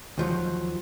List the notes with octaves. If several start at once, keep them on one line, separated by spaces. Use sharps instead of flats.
D#2 F3 F#3